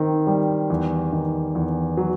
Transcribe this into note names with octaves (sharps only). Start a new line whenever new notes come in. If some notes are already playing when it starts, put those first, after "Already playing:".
Already playing: D#3 C4
G3
E2
D#3
E2
F#3